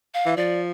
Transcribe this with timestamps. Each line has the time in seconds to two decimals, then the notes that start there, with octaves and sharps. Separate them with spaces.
0.14 F5
0.26 E3
0.37 F3 D5